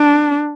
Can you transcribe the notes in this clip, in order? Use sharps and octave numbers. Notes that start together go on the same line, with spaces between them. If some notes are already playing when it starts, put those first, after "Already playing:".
Already playing: D4